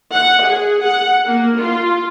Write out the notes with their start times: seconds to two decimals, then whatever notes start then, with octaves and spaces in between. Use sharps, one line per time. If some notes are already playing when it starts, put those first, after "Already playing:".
0.13 F#5
0.45 G#4
0.85 F#5
1.26 A#3
1.60 F4